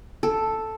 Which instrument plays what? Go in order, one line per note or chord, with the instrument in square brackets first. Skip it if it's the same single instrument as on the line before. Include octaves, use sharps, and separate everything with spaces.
[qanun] A4